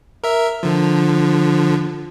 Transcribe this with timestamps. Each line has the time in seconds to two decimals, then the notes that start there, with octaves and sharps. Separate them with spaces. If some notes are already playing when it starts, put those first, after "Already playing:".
0.24 A#4 E5
0.63 D3 F3